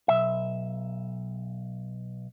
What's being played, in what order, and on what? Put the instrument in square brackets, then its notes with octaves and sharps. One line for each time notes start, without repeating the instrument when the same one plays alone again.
[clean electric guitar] B1 E5